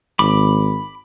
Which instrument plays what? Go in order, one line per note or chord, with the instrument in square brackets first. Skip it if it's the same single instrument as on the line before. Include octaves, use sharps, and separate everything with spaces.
[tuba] G#1 [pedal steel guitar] B5 D6